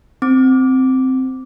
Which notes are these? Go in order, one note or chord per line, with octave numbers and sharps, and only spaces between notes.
C4 D6